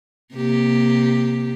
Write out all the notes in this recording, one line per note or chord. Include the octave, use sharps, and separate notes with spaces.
C3 A#3 G4